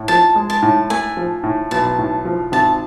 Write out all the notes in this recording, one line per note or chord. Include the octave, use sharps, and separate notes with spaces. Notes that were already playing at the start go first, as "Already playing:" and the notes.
Already playing: A2
F3 A5
G#3
A5
A2
A3 G#5
F3
A2
B1 A5
A2
F3
G#1 A5